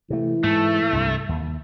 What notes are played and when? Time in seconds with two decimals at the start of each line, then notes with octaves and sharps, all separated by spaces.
0.10 C3 E3 A3
0.44 G#2 A3
0.93 C2 G2 C3
1.29 D#2